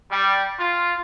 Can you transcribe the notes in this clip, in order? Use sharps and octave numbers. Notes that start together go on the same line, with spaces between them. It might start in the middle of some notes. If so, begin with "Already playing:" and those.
G3
F4